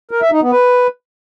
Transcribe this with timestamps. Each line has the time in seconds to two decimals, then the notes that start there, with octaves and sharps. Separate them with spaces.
0.11 A#4
0.21 E5
0.32 D#4
0.42 B3
0.52 B4